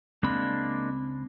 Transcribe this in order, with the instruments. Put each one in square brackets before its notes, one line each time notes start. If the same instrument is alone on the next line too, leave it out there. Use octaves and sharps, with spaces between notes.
[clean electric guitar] C#2 C4 B5 [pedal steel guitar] G#3 A#3 D4